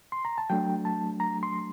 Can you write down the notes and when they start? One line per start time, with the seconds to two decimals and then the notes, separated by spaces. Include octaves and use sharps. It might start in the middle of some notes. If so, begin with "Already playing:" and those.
0.12 C6
0.25 A#5
0.38 A5
0.50 F#3 A3 D4 G5
0.85 A5
1.20 A#5
1.43 C6